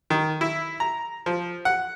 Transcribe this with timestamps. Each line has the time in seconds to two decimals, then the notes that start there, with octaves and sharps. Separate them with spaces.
0.10 D#3
0.41 E4
0.80 A#5
1.26 F3
1.65 F#5